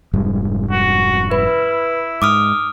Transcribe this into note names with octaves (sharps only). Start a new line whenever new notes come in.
F1 G#2 G3
F#4
E4 B4
G#2 D6 D#6 F6